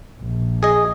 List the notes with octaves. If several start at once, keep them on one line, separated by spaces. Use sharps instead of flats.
A#1
G#4 D#5